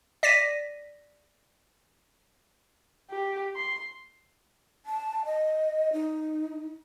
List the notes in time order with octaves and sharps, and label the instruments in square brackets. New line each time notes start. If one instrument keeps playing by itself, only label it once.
[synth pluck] D5 A#6 B6 D#7
[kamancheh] G4
C6
[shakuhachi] A5
D#5
D#4